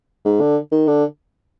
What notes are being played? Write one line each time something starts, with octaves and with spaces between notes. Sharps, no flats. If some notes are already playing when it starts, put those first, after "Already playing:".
G#2
D3
D#3
D3